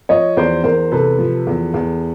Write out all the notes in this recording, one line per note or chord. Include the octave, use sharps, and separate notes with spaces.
F3 C#5 D#5
E2 C5 D5
E2 A#4 C5
C3 A4 B4
F3
E2
E2